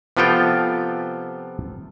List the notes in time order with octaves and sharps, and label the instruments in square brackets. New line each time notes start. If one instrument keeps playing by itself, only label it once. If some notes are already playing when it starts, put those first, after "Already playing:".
[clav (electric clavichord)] C3 F3 B3 F4 A4 G5